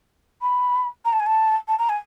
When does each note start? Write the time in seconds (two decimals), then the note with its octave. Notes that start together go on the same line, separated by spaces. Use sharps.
0.42 B5
1.05 A#5
1.12 A5
1.20 G#5
1.26 A5
1.68 A5
1.79 A#5
1.89 G#5